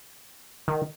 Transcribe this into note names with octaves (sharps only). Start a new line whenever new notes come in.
D#3